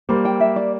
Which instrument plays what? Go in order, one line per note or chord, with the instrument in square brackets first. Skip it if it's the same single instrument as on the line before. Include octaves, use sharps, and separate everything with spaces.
[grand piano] G3 A#3 [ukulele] C5
[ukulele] G5
E5
D5